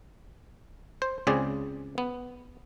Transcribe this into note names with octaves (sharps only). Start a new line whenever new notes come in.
C5
C#2 C#3 C4 G#4 D5
B3